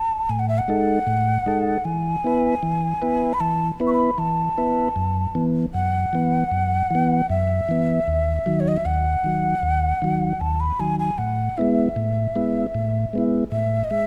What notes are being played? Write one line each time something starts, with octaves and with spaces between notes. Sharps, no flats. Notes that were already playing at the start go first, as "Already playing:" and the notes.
Already playing: A5
A2 G#5
F#5
E5
F#5
G#3 D#4 A4
A2
G#3 D#4 A4
E3 G#5
B3 E4 B4
E3
B3 E4 B4
B5
E3 A5
B3 E4 B4
C#6
B5
E3 A5
B3 E4 B4
F#2
E3 B3
F#2 F#5
E3 B3
F#2
E3 B3
F#2 E5
E3 B3
D#2
D#3 F#3
C#5
D#5
E5
D#2 F#5
D#3 F#3
D#2
D#3 F#3
D#2 A5
B5
D#3 F#3 G#5
G#5
A2 F#5
G#3 B3 E4 E5
A2
G#3 B3 E4
A2
G#3 B3 E4
A2 E5
D#5
G#3 E5